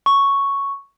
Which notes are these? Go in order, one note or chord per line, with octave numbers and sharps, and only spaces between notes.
C#6